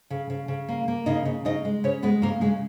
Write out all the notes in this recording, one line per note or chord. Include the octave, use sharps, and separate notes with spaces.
C#3
C#3
C#3
A#3
A#3
C#3 D#4 D#5
C#3
C#3 D#4 D#5
G#3
C#3 C#4 C#5
G#3 B3 B4
C#3 A#3 A#4
C#3 G#3 G#4